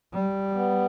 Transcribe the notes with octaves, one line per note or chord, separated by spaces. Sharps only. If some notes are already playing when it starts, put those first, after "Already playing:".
G3
B3